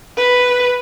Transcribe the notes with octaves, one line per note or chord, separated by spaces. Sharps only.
B4